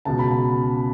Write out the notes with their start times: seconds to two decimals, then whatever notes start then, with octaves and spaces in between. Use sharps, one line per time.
0.05 C#2 B2 A5
0.19 B5
0.31 A5